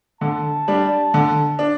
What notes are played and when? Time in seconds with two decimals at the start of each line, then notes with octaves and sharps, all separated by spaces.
0.21 D3 A5
0.68 G3 D4
1.14 D3
1.59 D4